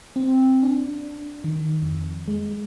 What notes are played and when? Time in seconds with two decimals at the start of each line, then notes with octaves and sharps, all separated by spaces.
0.16 C4
0.63 D4
1.44 D#3
1.83 F2
2.28 G#3